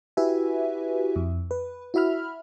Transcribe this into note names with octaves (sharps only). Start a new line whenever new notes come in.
E4 F#4 G4 B4 E5 G#5
F2
B4
E4 F#4 E5 B5 F6